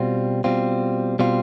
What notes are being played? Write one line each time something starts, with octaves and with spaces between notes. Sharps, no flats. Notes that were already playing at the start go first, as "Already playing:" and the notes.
Already playing: B2 G3 C4 F4
B2 G3 C4 F4
B2 G3 C4 F4